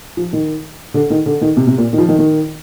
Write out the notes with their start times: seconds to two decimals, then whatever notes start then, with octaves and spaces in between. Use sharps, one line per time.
0.17 F3
0.33 D#3
0.94 D3
1.10 D#3
1.26 D3
1.41 D#3
1.57 C3
1.67 C3
1.78 A#2
1.93 D#3
1.98 F3
2.08 D#3
2.19 D#3